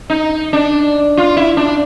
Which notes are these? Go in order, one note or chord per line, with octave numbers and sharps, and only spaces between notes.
D#4
D4
F4
E4
D4